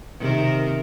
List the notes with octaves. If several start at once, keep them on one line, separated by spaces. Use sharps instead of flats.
C3 D#3 A#4